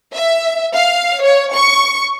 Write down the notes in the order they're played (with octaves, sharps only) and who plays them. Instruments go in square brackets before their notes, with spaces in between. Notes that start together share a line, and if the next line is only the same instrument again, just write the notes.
[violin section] E5
F5
C#5
C#6